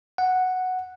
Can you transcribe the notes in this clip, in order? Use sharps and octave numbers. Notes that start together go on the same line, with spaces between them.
F#5